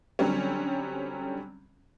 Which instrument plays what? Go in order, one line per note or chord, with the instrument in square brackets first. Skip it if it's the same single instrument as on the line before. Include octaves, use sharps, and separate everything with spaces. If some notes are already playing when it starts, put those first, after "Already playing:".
[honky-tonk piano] D3 F#3 G3 C4 C#4